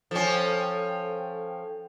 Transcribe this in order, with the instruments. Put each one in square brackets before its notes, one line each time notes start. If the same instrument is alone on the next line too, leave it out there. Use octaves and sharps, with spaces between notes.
[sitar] F3 C#4 [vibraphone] A4 G5